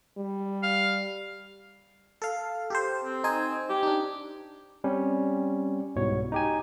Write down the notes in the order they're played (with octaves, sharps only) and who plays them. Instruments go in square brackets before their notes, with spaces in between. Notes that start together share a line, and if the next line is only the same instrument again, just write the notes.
[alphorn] G3
[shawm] F5
[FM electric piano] A4 F5
G4 A4 C5
[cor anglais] C4
[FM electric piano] D#4 C5 G#5
[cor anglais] G4
[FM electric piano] D4 D#4
[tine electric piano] G3 C4 C#4
C2 G#2 B2 C#5
D#4 G4 G#5